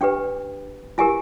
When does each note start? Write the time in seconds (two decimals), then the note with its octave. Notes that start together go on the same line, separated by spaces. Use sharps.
0.01 D4 G4 B4 G5
0.98 E4 G4 A#4 G#5